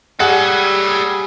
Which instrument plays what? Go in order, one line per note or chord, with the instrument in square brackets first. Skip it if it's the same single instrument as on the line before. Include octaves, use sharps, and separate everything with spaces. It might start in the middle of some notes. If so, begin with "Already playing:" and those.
[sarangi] G3 [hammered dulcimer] G#4 [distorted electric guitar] A4 C#5 [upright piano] F#5